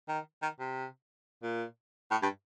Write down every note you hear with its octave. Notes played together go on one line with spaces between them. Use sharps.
D#3
D#3
C3
A#2
A2
G2